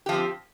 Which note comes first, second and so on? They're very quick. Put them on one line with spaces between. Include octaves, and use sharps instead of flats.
G4 F3 C4